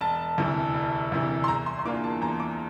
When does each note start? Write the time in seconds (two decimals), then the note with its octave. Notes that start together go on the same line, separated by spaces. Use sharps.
0.01 E1 A5
0.38 D2 C3 E3
0.74 E1
1.12 D2 C3 E3
1.44 C6
1.48 E2 A#5
1.66 C6
1.79 C6
1.85 E3 A#3 D4 F4 D6
2.04 A5
2.21 E2 A#5
2.40 D6